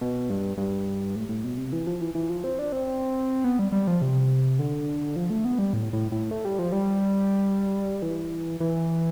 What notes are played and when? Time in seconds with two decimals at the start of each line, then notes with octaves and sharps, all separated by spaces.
0.01 B2
0.30 G2
0.57 G2
1.16 A2
1.29 A2
1.44 B2
1.58 C3
1.73 E3
1.87 F3
2.01 E3
2.15 E3
2.30 F3
2.44 C4
2.59 D4
2.72 C4
3.44 B3
3.59 G3
3.72 G3
3.87 F3
4.02 C3
4.59 D3
5.16 F3
5.30 A3
5.45 B3
5.59 G3
5.73 A2
5.93 A2
6.12 A2
6.31 A3
6.45 G3
6.59 F3
6.72 G3
8.02 E3
8.60 E3